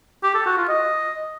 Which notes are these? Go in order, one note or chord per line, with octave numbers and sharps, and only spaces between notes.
G4
A4
F#4
F4
D#5